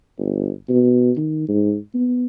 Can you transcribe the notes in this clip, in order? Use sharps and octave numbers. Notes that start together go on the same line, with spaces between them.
G1
B2
D#3
G#2
B3